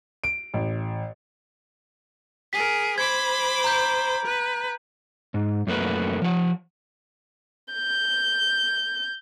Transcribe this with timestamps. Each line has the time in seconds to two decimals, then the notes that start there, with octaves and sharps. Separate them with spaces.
0.24 D7
0.54 A1
2.53 G#4 A#4 B6
2.98 C5 B5 D6 G#6
3.64 A#5 G6
4.24 B4
5.34 G#2
5.67 F#2 A3 A#3 B4
6.22 F3 F#5
7.74 G6